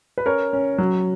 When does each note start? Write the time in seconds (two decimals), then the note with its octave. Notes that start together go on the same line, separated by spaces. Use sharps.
0.18 B4
0.26 C#4 A#4 C#5
0.53 C#4
0.78 F#3